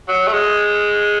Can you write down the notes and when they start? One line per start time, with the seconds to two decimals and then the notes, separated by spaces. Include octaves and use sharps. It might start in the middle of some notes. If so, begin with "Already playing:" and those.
0.08 F#3
0.28 A3
0.33 G#3